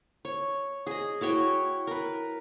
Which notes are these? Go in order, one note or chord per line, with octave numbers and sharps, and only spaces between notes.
C#5
G#4 D#5
E4 F#4 C#5 G5
A#4 B4